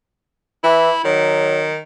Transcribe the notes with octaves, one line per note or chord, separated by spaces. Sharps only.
E3 E4
D#3 F#3